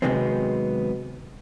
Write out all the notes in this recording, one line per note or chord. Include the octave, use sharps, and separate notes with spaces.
C3 D#3 F#3 G#3 B3 C4